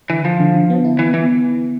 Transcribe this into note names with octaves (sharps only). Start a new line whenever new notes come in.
D3 E3
D3 F3
D3
D3
B3
E4
E3 B3
E3 B3